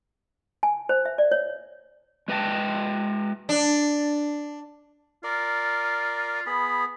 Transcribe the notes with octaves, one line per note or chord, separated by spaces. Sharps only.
G#5
C5
E5
D5
C#5
G#3 B4 D#5 G5 A5
D4
F4 A#4 D5
B3 G#4 B5